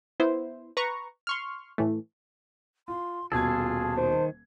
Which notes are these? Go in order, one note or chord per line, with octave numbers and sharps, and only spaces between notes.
B3 E4 C5
B4 A#5 C#6
C6 C#6 F6
A2 E3 A3
F4 C6
D#1 B2 F4 G#4 A4 A5 G#6
D#3 C5